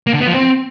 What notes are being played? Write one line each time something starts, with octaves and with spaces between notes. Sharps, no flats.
A#3
D3
B3
F3
C4